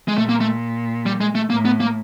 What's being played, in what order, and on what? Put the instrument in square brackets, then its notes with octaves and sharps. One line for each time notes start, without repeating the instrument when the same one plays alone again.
[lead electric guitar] G#3
[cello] A#2 [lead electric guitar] A3
[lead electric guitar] A#3
A3
G3
G#3
A3
[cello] A2 [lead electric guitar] A#3
[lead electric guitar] B3
A#3